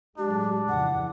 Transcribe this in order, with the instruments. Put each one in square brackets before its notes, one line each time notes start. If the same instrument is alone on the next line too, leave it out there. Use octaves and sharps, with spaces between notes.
[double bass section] A2 F#3 G#3 [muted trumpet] D4 [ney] G4
[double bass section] F2 C#3 E3 [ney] F#5